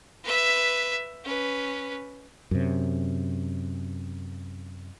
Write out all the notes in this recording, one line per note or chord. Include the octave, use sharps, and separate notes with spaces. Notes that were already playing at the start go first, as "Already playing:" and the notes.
B4 E5
C#4 B4
F#2 C3